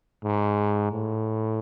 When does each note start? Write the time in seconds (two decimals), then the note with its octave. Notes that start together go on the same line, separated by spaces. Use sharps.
0.24 G#2
0.91 A2